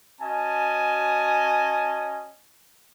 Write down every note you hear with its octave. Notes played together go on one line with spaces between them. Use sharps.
C#4 F#4 D#5 G#5 A5